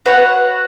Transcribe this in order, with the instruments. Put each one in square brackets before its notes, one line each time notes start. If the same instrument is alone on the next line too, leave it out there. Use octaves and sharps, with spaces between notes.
[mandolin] F#4 C#5 F#5 [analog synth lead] B4